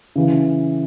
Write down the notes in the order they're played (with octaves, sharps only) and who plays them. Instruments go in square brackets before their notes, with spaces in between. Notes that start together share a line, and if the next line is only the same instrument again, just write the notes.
[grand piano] C#3 E3